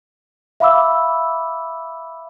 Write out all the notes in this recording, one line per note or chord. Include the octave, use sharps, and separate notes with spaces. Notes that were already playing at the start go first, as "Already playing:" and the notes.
E5 F5 B5 D6 E6